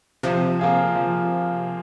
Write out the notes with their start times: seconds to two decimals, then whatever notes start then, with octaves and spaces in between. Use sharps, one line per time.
0.23 C3 F3
0.59 A#3 F4 G#4
0.95 F3